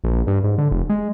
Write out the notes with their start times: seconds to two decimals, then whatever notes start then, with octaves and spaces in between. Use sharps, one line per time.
0.04 A#1
0.27 G2
0.44 G#2
0.58 D3
0.71 F1
0.89 G#3